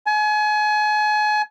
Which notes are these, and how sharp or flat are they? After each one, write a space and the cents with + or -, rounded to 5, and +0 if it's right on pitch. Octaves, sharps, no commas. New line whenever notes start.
G#5 +35